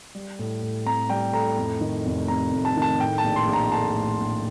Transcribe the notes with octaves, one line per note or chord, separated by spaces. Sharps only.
G3
A2
A2
C4 A#5
G3 G5
A2 A#5
F2
D#3
F1
C3 A#5
F2
A5
D#3
A5
A2 G5
A5
A#1
C6
A#1
A#5
A3 A5
A2
A#1